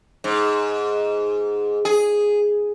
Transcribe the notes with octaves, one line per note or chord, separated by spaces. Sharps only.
G#2
G#4